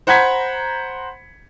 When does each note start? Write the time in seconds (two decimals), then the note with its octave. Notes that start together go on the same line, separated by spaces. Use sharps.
0.07 C5 F#5 A#5 B5 G#6 B6